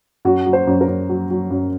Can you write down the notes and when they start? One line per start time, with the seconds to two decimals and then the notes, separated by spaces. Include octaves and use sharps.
0.25 F#2 F#4
0.46 F#3
0.53 C5
0.67 F#2
0.81 A#4
0.88 F#2
1.09 F#3
1.31 F#3
1.50 F#2